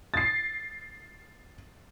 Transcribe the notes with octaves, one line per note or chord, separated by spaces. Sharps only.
A6 C7